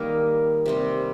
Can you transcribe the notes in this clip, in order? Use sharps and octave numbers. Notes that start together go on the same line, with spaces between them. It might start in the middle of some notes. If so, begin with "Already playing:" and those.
Already playing: D#3 G3 A#3 D#4 A#4
C3 G3 C4